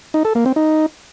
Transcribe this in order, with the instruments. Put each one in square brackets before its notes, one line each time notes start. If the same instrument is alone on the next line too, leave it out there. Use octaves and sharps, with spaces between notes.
[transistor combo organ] D#4
A4
A#3
C4
D#4